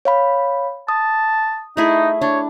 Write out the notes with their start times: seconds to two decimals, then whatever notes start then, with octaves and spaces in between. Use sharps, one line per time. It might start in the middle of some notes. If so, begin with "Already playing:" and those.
0.05 C#5 F5 B5
0.89 A5 D#6
1.77 A3 D#4 E4 G#4
2.22 D4 C#5